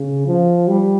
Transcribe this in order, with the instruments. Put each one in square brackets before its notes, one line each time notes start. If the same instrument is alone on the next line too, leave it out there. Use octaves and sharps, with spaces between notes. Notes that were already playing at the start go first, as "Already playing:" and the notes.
Already playing: [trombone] C#3
F3
G3